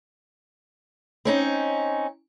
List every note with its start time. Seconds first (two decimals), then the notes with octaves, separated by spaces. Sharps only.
1.25 C4 C#4 D#4